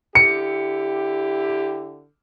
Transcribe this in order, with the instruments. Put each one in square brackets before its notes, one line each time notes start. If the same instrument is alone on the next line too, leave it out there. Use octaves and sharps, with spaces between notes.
[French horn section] D3 E4 G4 [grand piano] C#7